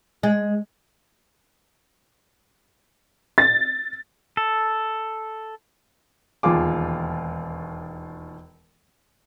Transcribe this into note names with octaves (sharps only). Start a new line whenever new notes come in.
G#3
A6
A4
E1 D#2 F3 F4 G#4 D6